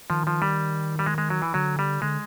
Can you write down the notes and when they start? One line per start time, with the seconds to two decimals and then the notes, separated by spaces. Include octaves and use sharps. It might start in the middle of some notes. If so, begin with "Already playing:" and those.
0.10 D#3 F3
0.27 F3
0.42 G3
0.99 G3
1.06 G#3
1.18 G#3
1.30 F#3
1.42 E3
1.54 D3 F#3
1.79 G3
2.02 D3 G#3